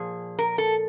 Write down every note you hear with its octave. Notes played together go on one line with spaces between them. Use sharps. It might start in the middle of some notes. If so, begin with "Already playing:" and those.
Already playing: A#2 F3 G#4
A#4
A4